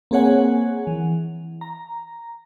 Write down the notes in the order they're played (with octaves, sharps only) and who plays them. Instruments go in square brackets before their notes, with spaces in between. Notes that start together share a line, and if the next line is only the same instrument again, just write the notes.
[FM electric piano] A#3 C4 G#4 C#5 F#5 G#5
E3
A#5